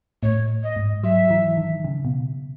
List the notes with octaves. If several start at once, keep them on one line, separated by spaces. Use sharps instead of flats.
A2 C#5
D#5
G#2
F#3 E5
E3
D#3
C#3
B2